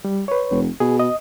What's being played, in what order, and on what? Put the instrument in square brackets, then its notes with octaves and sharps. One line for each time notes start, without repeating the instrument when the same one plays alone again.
[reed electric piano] G3
B4 C#5
[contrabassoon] F1
[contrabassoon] B2 [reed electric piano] G#4
[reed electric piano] D#5